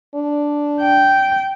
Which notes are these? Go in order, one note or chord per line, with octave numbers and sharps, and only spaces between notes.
D4
G5